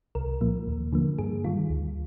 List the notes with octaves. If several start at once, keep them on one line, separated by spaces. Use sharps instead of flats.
C2 A#4
A#2 F3 A#3
D#2
D3 F3 A#3
G2 G#4
D#3 G3 F4
D2